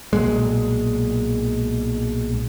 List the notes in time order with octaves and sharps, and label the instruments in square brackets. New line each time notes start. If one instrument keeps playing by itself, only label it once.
[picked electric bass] B1 A#2 G#3